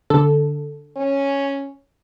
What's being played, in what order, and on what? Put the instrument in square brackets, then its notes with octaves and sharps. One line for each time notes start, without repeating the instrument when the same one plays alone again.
[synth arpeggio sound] D3 A4
[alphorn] C#4